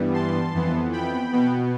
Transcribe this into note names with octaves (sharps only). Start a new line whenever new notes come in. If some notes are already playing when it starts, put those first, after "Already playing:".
Already playing: G2 E3 G3 B3
A5 C6
F2 E3 B3
G5 B5
B2 B3